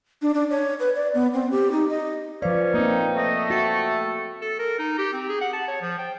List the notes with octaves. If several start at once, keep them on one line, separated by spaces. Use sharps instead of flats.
D4
D4
C#5
B4
D5
B3
C4
G4
D#4
D#5
F3 C#4 B4 C5 D5 F5
A#3 C4 D#4
A3 D#5
F#4 A4 E5 G5 C#6
A4
A#4
D#4
G4
C4
G#4
F#5
A5
C#5
F3
G5